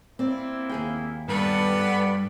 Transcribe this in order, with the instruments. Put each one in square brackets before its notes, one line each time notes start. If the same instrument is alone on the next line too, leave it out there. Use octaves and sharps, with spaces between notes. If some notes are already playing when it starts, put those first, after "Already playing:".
[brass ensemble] A#3 E4 [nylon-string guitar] C4 D5
[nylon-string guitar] D#2 G#4 G5
[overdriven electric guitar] G2 [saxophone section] B3 [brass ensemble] A4 B4 D5